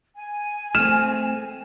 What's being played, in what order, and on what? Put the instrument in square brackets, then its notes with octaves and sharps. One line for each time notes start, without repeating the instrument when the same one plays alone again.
[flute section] G#5
[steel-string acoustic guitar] A3 C4 [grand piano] F6 E7